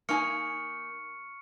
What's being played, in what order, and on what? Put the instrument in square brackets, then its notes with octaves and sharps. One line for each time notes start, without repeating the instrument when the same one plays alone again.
[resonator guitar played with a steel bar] A#3 D#4 G#5 [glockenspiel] C#6 F6 C#7